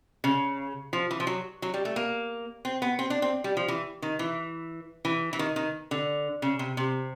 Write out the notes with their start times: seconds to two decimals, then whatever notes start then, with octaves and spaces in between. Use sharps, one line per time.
0.24 C#3
0.93 F3
1.11 E3
1.20 F3
1.27 F#3
1.62 F#3
1.74 G3
1.85 A3
1.96 A#3
2.65 C4
2.82 B3
2.99 C4
3.10 D4
3.22 C4
3.44 G3
3.57 F3
3.68 E3
4.02 D#3
4.19 E3
5.05 E3
5.33 E3
5.39 D#3
5.56 D#3
5.91 D3
6.42 C#3
6.59 C3
6.77 C3